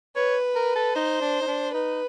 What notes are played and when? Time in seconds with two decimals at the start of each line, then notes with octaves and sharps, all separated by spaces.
0.16 B4 C#5
0.56 A#4
0.76 A4
0.95 D#4 C5
1.21 D4
1.42 D#4
1.47 D4
1.74 D#4 B4